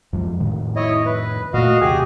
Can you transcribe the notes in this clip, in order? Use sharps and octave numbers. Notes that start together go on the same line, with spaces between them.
F2 F3 G#3
F2 A2 D#3
E4 C#5 D#5
B4
A#2 A3 F#4 D#5 F5
E2 C3 G4 G#4 G#5